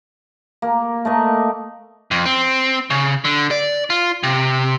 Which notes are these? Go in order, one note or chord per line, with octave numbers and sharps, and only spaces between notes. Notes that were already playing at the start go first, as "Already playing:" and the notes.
A#3
A3 A#3 D#5
F2
C4
C#3
D3
D5
F4
C3